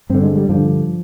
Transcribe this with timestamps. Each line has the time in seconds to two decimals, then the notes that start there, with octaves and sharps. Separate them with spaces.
0.10 G2 D3 C4
0.23 G#3
0.37 G3
0.49 G2 D3 F3